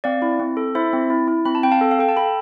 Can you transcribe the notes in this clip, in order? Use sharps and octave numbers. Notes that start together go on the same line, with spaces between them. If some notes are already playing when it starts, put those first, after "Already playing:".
C4 D5 F5
E4
C4
A4
E4 C5 E5
C4
E4
E4
C4 B5
A5
C4 G5
F5 A5
A4
F5
A4 G5
A5
A4 G5 B5